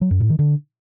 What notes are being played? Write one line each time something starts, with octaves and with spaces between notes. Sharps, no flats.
F#3
F#2
A2
D#3
D3